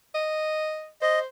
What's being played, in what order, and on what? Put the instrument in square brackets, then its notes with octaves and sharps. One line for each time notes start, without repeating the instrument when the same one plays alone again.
[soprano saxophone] D#5
[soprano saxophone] C5 [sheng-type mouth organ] D#5